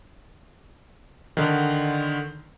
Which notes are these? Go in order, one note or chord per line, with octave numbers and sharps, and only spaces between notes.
D3 D#3